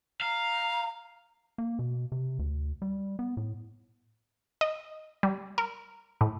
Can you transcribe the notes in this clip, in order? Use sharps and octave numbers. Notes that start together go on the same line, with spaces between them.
F5 A#5
A#3
B2
C3
D2
G3
B3
A2
D#5
G3
A#4
A2